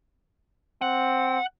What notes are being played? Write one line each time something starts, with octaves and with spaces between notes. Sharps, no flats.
C4 F#5